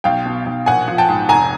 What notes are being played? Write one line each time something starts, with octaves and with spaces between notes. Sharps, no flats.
B1 F5 G5
B2
B1
A#1 F#5 G#5
F3
G5 A5
G#2
F1 G#5 A#5